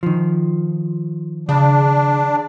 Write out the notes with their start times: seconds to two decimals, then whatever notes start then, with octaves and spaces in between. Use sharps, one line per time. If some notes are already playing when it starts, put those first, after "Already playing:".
0.03 D#3 F3
1.49 C#3 D4